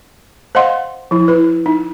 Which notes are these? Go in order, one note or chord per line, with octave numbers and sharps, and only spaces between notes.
C5 D#5 F5 F#5 C6
F3 E4
E4 B4
D#4